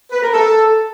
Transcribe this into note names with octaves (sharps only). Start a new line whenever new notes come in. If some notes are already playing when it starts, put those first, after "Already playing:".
B4
A#4
A4